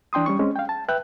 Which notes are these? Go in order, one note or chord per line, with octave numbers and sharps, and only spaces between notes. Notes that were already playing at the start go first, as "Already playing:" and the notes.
E3 D4 G5 C6 D#6
G3 C#4 C#6
G#3 C4 C#4
F5 G5
A5
B4 E5 G5 F#6